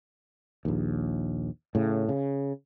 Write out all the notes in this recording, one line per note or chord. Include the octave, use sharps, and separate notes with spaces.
A#1 D#2
A2 C#3
C#3